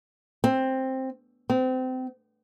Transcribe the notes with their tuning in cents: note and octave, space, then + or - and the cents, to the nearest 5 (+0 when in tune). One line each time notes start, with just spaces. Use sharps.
C4 +10
C4 -30